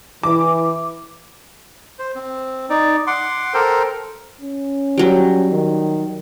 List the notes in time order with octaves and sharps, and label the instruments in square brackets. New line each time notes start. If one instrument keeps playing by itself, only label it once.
[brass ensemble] E3 [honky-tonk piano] D6
[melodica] C5
C4
D#4 D5
F#5 C6 D6
A4 A#4 C5 G5
[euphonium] C#4
[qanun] F#3 G3
[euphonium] D#3